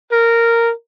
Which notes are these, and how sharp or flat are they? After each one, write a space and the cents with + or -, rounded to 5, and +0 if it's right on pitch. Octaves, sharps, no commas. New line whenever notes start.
A#4 -10